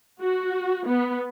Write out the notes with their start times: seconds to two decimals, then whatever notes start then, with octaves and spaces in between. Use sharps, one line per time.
0.20 F#4
0.86 B3